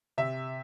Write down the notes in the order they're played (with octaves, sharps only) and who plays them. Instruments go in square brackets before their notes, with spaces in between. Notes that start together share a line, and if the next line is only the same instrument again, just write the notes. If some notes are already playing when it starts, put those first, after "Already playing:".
[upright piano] C3 E5